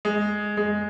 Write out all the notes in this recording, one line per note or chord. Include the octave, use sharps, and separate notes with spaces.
G#3
G#3